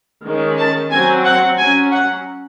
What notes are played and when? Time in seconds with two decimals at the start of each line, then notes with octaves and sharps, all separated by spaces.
0.24 D#3 G#3 C#4
0.58 A5
0.91 F#3 C4 G#5
1.24 F#5
1.57 F#3 C#4 G#5
1.91 F#5